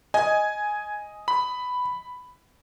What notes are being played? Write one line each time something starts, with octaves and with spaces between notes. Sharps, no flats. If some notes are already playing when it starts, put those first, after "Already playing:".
D#5 G#5
B5